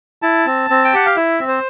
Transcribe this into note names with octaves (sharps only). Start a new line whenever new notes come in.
E4 A5
C4
C4
G5
G4 F#5
F5
E4 E5
C4
C5